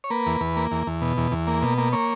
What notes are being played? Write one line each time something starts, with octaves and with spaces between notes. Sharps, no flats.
C#5
A#3 B4
E2
E2
A#3
E2
E2
B2
E2
E2
A#3
B2
A#3
A#3 C#5